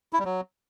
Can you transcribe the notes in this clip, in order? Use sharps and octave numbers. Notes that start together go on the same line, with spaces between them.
E4
G3
F#3